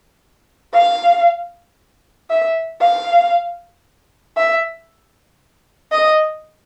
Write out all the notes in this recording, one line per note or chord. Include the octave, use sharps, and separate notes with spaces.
F5
E5
F5
E5
D#5